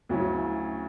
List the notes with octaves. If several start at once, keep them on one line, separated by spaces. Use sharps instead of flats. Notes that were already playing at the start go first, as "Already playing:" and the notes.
D2 C#3 F#3 C#4 E4